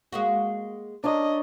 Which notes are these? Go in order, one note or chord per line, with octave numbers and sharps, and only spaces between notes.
G#3 A#3 F#4
D4 A#4 C#5 D#5